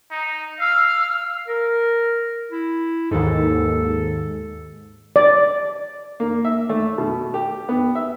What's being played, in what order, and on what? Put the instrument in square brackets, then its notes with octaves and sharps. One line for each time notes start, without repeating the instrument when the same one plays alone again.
[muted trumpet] D#4
[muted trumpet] F5 [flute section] E6 F6
[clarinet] A#4
E4
[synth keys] D#2 G#2 [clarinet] A4
[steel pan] D5
[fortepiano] A#3
E5
A3
B2
G4
B3
E5